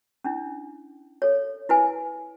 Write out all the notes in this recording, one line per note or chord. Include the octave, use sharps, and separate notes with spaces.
C#4 D4 E4
A4 C#5
E4 B4 G#5